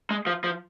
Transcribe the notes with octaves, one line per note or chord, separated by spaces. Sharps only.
G#3
F3
F3